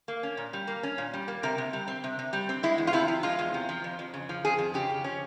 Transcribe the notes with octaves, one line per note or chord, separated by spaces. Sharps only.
A#3
C#4
A#2
G3
A#3
C#4
A#2
G3
A#3
C3 A#4
C3
G3
C4
C3
C3
G3
C4
G#3 E4
E2
F4
C3 E4
F3
G#3 F4
E2
C3
F3
F2
F2
C#3
F3
F2 G#4
F2
C#3 G4
F3
C#4